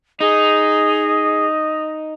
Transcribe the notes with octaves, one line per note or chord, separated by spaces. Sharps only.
D#4 G#4 D#5